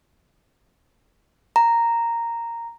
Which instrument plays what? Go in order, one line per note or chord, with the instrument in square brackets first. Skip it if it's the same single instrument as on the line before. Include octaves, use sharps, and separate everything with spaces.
[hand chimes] A#5